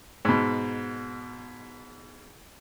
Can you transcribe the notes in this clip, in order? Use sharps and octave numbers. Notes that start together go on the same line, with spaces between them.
G#2 B2